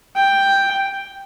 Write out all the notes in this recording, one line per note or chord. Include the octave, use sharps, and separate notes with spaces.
G5